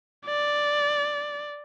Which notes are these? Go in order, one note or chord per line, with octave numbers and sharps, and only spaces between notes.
D5